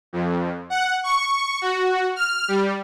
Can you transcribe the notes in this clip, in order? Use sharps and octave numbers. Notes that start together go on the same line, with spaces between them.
F2
F#5
C#6
F#4
F6
G3